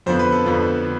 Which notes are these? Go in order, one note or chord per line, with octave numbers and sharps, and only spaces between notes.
F2 D3 F3 B3 C5
B4
A4
F2 D3 F3 B3
D3